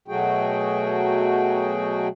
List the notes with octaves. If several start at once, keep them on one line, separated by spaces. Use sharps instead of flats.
B2 F#3 A3 F#4 G#4 G5